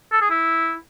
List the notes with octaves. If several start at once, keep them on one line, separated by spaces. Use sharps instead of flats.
A4
G#4
E4